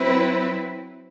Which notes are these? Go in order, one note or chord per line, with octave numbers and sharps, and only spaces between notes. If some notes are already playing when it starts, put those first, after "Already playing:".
Already playing: F#3 C4 E4 B4